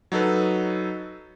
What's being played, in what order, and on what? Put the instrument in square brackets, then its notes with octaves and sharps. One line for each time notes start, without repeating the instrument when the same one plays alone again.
[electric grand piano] F#3 D#4 A4 B4